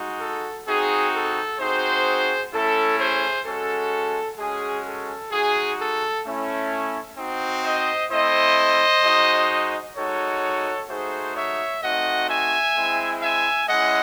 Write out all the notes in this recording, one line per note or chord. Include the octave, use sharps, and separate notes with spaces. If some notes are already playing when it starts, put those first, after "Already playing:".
Already playing: G#3 D#4 F#4
A4
C4 D#4 F#4 G#4
A4
C4 D#4 F#4 G#4 C5
A3 C#4 E4 A4
G#4 C5
G#3 C#4 F#4 A4
G#3 C#4 F#4 G#4
A4
G#3 D#4 F#4 G#4
A4
A3 C#4 E4
C4 D#4 F#4
C5 D#5
A3 C4 E4 C5 D#5
G#3 D#4 F#4
G#3 D#4 F#4 A4 C#5
A3 D#4 F#4 G#4 C5
C#5 E5
A3 C4 D#4 F#4 D#5 F#5
E5 G#5
G#3 C4 E4
E5 G#5
G#3 C#4 E4 D#5 F#5